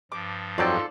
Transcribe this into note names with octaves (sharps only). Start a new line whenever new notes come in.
G2 F3 D6
F2 G#2 F#3 F4 A4 C5 D5 G5